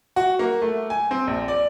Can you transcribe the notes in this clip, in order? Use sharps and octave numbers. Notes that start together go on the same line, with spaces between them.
F#4
A#3
A3
G#5
C4
A#1
D5